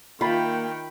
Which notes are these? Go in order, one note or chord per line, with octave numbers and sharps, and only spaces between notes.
D#3 A#3 F4 G5 B5